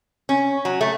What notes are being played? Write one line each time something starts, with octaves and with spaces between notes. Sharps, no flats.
C#4
F#3
A3